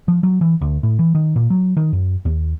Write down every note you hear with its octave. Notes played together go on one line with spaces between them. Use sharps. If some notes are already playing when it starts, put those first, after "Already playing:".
F3
F#3
E3
D2
A2
E3
D#3
A#2
F#3
D#3
F#2
D#2